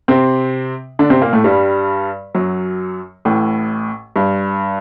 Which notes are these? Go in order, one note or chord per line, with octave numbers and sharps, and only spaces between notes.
C3 C4
D3 D4
C3 C4
A#2 A#3
A2 A3
G2 G3
F#2 F#3
A1 A2
G2